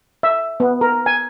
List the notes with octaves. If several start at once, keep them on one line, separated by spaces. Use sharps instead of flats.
E5
B3
A#4
G#5